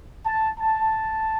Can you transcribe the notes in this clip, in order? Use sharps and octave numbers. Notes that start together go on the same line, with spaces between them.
A5
A5